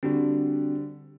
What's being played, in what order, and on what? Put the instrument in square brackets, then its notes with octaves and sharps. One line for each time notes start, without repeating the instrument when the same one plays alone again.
[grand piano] D3 G3 [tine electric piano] C4 D4 F#4